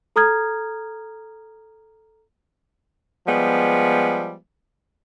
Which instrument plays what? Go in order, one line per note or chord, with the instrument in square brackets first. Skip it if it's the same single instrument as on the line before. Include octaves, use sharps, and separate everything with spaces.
[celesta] A4 A#5 D#6 F6 G#6
[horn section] F3 G3 G#3 B3